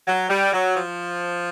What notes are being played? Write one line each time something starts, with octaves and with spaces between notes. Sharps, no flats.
F#3
G3
F#3
F3